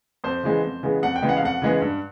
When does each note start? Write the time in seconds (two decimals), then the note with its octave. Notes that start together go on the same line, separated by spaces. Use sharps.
0.24 F2 C5
0.43 C#3 E3 G#3 B3
0.63 F2
0.83 C#3 E3 G#3 B3
1.02 F2 F#5
1.16 G5
1.22 C#3 E3 G#3 B3
1.29 F#5
1.37 F5
1.42 F2 F#5
1.62 C#3 E3 G#3 B3
1.81 G2